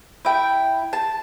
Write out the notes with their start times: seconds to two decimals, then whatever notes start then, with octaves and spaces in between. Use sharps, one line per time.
0.25 E4 G5
0.93 A5